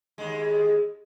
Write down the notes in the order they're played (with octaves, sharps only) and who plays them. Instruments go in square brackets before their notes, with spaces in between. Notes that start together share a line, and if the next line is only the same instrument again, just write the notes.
[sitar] D#2 G#3